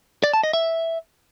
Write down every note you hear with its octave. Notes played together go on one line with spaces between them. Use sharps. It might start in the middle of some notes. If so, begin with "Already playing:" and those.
D5
A5
D#5
E5